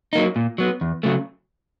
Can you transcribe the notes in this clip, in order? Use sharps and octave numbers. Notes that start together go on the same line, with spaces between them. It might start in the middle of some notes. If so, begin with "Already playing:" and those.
F#3 A#3 D#4
A#2
F#3 B3
E2
C#3 F#3 A3